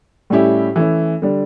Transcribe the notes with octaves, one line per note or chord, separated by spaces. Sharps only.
A2 G3 C#4 E4 G4
E3 A3 C#4 E4
D3 G3 D4